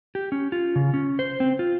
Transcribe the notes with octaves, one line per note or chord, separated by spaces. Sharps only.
G4
C#4
F4
C#3
C#4
C5
C4
F4